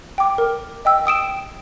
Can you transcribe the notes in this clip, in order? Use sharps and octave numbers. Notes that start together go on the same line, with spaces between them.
G5 D6
A#4
D#5 G5 E6
G5 D#6 D7 E7